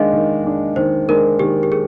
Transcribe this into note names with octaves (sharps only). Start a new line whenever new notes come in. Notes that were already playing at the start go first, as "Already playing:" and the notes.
Already playing: D#3 G#3 D4 D#5 F5
D#3
G#3 D4
D#3 C5
G#3 D4 A#4
D#3 G4
G4
G#4